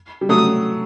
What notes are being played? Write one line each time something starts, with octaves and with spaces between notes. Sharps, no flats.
G3
F#3 A3 D#6